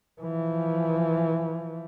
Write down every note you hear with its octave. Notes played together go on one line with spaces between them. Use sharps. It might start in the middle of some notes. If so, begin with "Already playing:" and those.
E3 F3